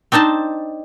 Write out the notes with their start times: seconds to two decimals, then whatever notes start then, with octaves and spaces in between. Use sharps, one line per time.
0.12 C4 D4 D#4 C5 A5